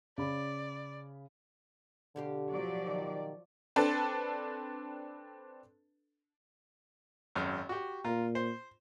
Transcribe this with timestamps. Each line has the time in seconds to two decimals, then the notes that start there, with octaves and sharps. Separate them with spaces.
0.18 C#3 D5 B5
2.16 B2 D3 G4 F5
2.50 F3 F#3 D5
2.85 D#3
3.76 C4 D4 A4 B4 A5
7.35 G#1 F#2 F6
7.69 F#4 G4
8.04 A#2 F4 A#5
8.35 C5